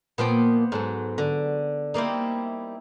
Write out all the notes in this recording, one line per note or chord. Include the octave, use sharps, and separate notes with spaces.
A#2 F3 A#3 B3 C5 G5
G#2 F#3 A4
D3
G3 A#3 C4 D#4 E4